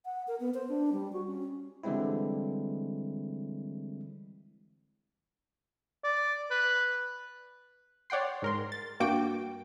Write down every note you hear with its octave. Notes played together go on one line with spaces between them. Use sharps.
F#5
A#4
B3
C5
D4
G3
F#4
C#4
D3 E3 G3 G#3 C4 E4
D5
B4
C#5 D5 F#5 G5 C6
G#2 A#4 C6
A6
G2 A#3 F#4 G5 D6 D7